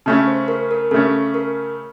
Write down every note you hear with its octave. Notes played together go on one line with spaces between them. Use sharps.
C#3 A3 C#4 A5
C5
A#4
A#4
C#3 A3 C#4 A4
A#4